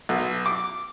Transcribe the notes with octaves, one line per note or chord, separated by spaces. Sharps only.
B1
D6